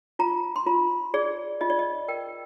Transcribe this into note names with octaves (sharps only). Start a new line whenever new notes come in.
F4 A#5
C6
F4 A#5
G#4 D5
F4 D#5
D5
D#5
A#4 G5